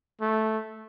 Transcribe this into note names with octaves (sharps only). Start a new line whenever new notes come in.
A3